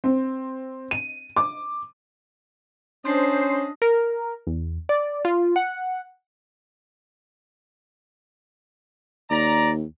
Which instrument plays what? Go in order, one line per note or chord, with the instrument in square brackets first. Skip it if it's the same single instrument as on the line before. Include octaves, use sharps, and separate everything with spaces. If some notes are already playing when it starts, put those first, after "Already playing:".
[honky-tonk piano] C4
D#7
D6
[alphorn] C#4 [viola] D4 D#5 [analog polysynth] C5 C7
[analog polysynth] A#4
E2
D5
F4
F#5
[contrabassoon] D#2 [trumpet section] D5 A#5